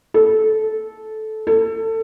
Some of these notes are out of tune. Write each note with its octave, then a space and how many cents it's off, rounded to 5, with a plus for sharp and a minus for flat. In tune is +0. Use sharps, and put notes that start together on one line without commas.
A4 -15
A4 +25